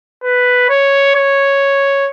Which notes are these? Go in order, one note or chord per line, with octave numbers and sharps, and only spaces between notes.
B4
C#5
C#5